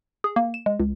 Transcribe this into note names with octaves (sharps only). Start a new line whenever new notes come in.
G#4
A#3
E7
G#3
C#2